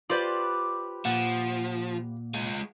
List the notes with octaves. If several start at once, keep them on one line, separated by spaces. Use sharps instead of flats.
F4 G4 B4 C5 D5
A#2 F3 F#5
G#3 F4